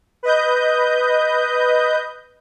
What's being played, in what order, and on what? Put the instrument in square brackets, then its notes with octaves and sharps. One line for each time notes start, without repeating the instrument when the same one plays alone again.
[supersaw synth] B4 D#5 G6